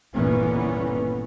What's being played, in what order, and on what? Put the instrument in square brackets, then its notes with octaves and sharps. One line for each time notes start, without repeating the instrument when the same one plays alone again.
[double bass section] G1 D#2 A#2 E3 B3 C#4